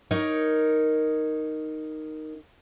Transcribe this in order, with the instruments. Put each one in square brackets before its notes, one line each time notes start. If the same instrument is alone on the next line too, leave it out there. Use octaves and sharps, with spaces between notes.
[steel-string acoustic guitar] D#4 A#4 C#5